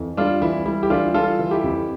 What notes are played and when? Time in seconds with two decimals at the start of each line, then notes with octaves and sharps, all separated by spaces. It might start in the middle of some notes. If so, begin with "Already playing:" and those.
Already playing: F2 E3
0.17 G3 D4 F4
0.41 E3 E4
0.65 G3 E4
0.83 G4
0.90 E3 D4 F4
1.14 G3 F4 A4
1.39 E3
1.51 E4 G4
1.64 F2